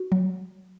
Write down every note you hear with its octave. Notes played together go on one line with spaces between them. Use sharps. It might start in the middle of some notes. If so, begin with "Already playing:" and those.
Already playing: F#4
F#3